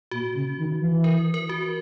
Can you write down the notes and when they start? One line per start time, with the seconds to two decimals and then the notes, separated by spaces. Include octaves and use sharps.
0.11 A#2 F#4
0.34 C#3
0.58 D#3
0.80 E3
1.04 A#4
1.34 A#4
1.49 F#4